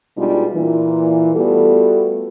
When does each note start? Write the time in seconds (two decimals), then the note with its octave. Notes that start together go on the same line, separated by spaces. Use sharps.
0.17 B2 G3 G#3 D4 D#4 F4
0.54 A#2 E3
1.35 G3 A3 B3 F4 F#4 A4